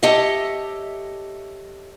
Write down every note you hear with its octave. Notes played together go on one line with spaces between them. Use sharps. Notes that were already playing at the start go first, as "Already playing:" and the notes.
G4 A4 C#5 D#5 E5